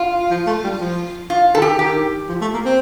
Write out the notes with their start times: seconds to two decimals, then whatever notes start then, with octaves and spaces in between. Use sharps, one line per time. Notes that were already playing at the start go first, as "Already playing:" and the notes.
Already playing: F4
0.31 F3
0.47 A3
0.64 G3
0.80 F3
1.30 F4
1.55 D#3 A4
1.62 G4
1.79 D#3 G4
2.29 F3
2.41 A3
2.54 A#3
2.65 C4